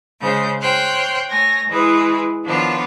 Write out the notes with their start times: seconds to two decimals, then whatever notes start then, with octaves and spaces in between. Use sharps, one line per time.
0.20 C#3 G#3 C5 G6
0.60 C5 C#5 G5 C6 F6 F#6
1.28 A3 C#5 G#5 A#6
1.68 E3 G#3 G#4 B4
2.43 D#3 F3 B3 D4 F4 C#5